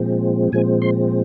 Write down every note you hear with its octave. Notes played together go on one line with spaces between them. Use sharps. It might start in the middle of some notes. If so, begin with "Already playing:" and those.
Already playing: A#2 F3 G#3 C4
A#2 F3 G#3 C4 G#5
C6